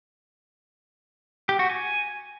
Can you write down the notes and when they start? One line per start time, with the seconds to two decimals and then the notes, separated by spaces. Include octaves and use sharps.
1.49 G4
1.59 F#4
1.70 G#5